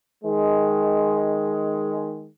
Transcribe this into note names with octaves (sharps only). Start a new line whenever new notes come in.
D#3 G#3